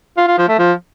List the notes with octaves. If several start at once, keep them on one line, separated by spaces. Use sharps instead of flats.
F4
F4
F3
A3
F3